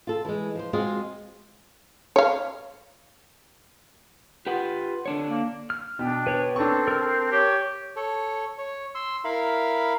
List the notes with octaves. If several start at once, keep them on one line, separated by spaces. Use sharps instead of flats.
F4 A4
E3 G#3
F3 C5
G#3 C4 F4 F#4 G#4
C#5 F5
F4 G4 B4 F#5
D3 D4 C#5
A#3
F6
B2 D4 G5
B4 C#5
C4 D4 A4 C#6
A#4 F6
G4 C#5
A4 C#5
C#5
C6 E6
E4 A#4 F5 B5